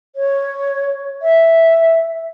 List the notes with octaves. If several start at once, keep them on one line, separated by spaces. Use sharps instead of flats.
C#5
E5